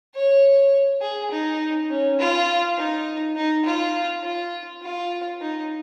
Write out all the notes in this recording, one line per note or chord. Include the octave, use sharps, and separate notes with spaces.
C#5
G#4
D#4
C#4
F4
D#4
D#4
F4
F4
F4
D#4